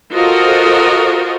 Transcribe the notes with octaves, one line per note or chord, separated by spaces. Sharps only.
F4 F#4 A4 A#4 C5 D#5